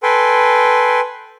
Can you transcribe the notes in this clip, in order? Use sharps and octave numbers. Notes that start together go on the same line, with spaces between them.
A4 B4 G5 G#5 C6